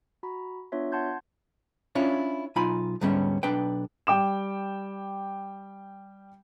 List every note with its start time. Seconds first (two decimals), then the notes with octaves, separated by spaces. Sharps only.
0.23 F#4 A#5 B5
0.72 B3 D4 F4 C#5 E5
0.92 F#5 A5 C6 G6 G#6
1.95 C#4 D4 E4 F4 C#5
2.56 B1 D#4 F4 G#5 B5
3.01 D2 G#2 G3 B3 C#4
3.43 B1 D4 B4 G5
4.07 G3 G5 D6 E7